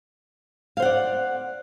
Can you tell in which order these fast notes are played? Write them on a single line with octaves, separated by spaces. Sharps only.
F5 C5 F#5 D5